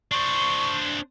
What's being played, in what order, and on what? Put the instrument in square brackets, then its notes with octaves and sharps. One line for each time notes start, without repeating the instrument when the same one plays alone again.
[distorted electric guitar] D4 C5 [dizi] C#6